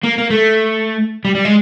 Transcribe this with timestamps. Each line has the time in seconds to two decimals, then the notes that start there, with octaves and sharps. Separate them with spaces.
0.03 A#3
0.18 A#3
0.30 A3
1.25 G3
1.35 G3
1.45 G#3